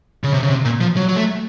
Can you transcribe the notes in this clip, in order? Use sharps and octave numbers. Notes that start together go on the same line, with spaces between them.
C#3
C3
C#3
C3
A#2
F3
F#3
F#3
A3